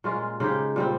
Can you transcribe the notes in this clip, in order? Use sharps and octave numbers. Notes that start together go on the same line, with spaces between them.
A#2 G#3 C#4 F4
C#3 G#3 D#4 G4
A#2 G3 C4